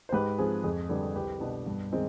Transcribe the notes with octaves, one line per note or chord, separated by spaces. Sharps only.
C5
G#2 G4 B4
F3 C4 G#4
F2 G#4
D3 G3 D4 G4 B4
C2 G4 B4
B2 B3 D4
G2
D#3 G#3 C4 D#4